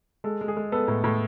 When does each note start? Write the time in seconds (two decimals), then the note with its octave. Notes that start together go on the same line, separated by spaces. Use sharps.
0.24 G#3 A4
0.41 G#3
0.48 G#4
0.57 G#3
0.72 B3 A4
0.88 A2
1.04 A2